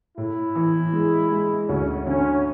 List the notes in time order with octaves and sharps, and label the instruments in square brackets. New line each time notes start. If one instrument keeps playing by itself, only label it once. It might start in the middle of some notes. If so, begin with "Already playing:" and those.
[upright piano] A2 [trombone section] E4
[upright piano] E3
G#3
G#3
[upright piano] D2 [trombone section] C#4
[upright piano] D3 [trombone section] C#4